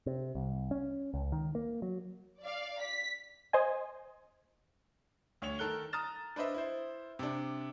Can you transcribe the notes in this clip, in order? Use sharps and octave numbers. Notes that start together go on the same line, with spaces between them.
C3
C2
C#4
C#2
D#3
A#3
F#3
D5 F5
B6
C5 D#5 G#5
D2 C#5 F7
D#3 A4 A#4 F#6 G7
A#5 D#6 F6 A6 E7
D4 B4 C5 D#5 E5
E4 C5
C3 D4